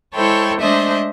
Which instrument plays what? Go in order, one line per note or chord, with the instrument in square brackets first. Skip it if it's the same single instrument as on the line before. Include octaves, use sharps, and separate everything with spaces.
[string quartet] G#3 E4 A4 C5 C#5 G5
G#3 A3 D4 C5 D#5 E5